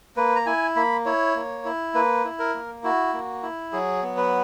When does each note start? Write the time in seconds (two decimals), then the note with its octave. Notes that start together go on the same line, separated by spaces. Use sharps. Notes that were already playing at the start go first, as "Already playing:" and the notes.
0.17 A#3 B4
0.36 A#5
0.46 E4 G#5
0.76 A#3 B5
1.06 E4 C#5
1.35 A#3
1.65 E4
1.94 A#3 B4
2.25 E4
2.39 A#4
2.54 A#3
2.84 E4 F#4
3.13 A#3
3.43 E4
3.73 F#3 G#4
4.03 B3
4.17 B4